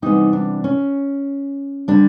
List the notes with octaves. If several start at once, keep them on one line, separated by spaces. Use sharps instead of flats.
C3 E3 G3 B3 D#4
D4
C#4
D3 G3 D4